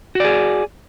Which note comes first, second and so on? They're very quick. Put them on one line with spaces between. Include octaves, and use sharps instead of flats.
F#4 D5 G#4